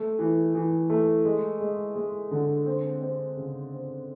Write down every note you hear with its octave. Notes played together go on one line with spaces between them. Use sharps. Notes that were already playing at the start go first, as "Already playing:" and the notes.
Already playing: A3
E3
E3
A3
G#3
G#3
G#3
D3
C4
C4
C#3
C4